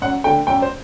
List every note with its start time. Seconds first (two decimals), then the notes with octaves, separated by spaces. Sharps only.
0.01 F#2 F#5
0.24 D3 A3 G5
0.47 F#2 G5
0.62 C5